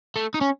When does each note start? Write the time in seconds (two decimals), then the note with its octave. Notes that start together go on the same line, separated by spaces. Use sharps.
0.16 A3
0.34 D#4
0.41 C#4